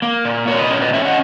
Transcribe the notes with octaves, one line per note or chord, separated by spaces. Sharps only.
A#3
A#2
A#2 A#4 C#5
B4 D#5
C#4 A#4 C#5
B4 D#5
C#4 C#5 E5
D#5 F#5